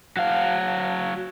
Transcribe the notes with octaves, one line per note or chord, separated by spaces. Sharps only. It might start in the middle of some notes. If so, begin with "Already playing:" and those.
F#3 F5